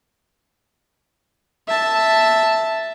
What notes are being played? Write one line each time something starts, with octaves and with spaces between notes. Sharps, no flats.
E5 A5